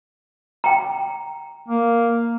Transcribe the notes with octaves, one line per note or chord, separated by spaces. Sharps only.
G5 A#5
A#3